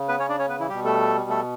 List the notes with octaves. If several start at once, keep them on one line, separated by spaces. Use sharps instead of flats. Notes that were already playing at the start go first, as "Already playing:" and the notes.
Already playing: C#3
B3 B4
C#4 C#5
D4 D5
C#4 C#5
B3 B4
E3 E4
B2 G3 G4
A3 A4
A3 A4